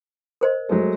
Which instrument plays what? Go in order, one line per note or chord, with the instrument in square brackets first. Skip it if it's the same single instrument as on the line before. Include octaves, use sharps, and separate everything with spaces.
[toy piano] A#4 C5 D#5
[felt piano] F#3 G#3 A3